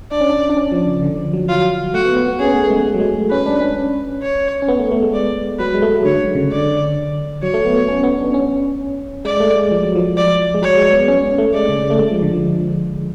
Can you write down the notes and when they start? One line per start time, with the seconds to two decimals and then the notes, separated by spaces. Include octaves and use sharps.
0.11 D4 D5
0.21 C#4
0.30 D4
0.49 D4
0.57 C#4
0.72 F3
0.87 C#3
1.03 D3
1.17 F3
1.33 F#3
1.48 F#3 F4
1.94 A3 F#4
2.05 B3
2.17 B3
2.28 B3
2.39 C#4 G#4
2.47 B3
2.54 A3
2.70 G#3
2.81 G#3
2.86 A3
2.94 F#3
3.00 G#3
3.16 A3
3.31 C#4 B4
3.46 D4
3.61 C#4
4.22 C#5
4.62 C#4
4.68 B3
4.79 A3
4.92 A3
5.03 G#3
5.14 D5
5.59 F#3 B4
5.74 G#3
5.82 A3
5.94 F#3
6.05 D3 C#5
6.20 D3
6.35 C#3
6.52 D3 D5
7.43 F#3 C#5
7.54 A3
7.65 B3
7.76 A3
7.88 C#4
8.03 B3
8.18 D4
8.34 C#4
9.25 G#3 D5
9.40 A3
9.56 G#3
9.72 F3
9.83 F#3
9.95 F3
10.17 D5
10.54 G#3
10.62 F#3 C#5
10.78 G#3
10.92 B3
11.08 C#4
11.24 C#4
11.38 A3
11.54 G#3 D5
11.69 C#3
11.90 A3
11.99 G#3
12.10 F3
12.23 D3
12.33 F3